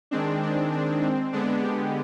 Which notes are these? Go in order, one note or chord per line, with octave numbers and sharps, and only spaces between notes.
D#3 G#3 C4 D4
D4
D4
C4
D3 G#3 B3 D4
G4